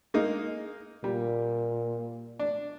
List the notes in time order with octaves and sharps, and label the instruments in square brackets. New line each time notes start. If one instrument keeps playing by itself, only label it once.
[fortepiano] G#3 A#3 D#4
[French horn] A#2 [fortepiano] G3
[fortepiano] D4